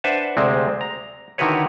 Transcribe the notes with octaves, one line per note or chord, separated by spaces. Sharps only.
D4 B4 C5 E5 F#5 A5
D2 C3 G#3 C4
A#5
D3 D#3 E4 F#4 B4 C#5